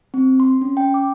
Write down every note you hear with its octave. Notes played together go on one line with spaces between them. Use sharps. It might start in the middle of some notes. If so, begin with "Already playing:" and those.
C4
C6
C#4
G5
D6